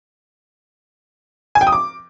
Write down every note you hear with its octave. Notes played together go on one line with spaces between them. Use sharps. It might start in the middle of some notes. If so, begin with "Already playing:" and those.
G#5
G5
D#6
D6